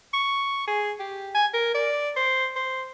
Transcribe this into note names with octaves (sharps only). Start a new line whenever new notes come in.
C#6
G#4
G4
G#5
A#4
D5
C5
C5